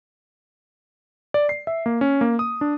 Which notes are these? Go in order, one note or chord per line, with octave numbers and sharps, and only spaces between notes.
D5
C7
E5
A#3
C#4
A#3
D#6
D4